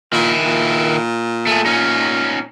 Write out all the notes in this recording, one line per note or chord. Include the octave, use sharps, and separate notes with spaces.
A#2 D#3 E4
A#2
A3 G#4
C#4 D#4